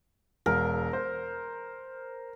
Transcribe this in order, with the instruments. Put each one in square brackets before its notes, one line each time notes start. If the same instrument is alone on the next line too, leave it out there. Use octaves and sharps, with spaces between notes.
[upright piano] E1 [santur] A#4
[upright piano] C5